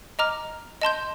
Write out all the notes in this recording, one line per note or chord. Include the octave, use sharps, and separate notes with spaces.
D#5 A#5 D6 F6
D#5 A5 C6 G6